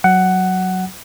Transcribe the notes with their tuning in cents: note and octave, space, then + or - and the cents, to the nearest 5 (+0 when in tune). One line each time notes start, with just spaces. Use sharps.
F#3 +0 F#5 +10